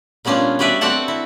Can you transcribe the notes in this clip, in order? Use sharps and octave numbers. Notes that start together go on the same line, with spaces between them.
A#2 G3 B3 C#4 D4 F4
G3 F#4 B4 D5 E5
C4 F#4 A4 D5 F#5 A5
E4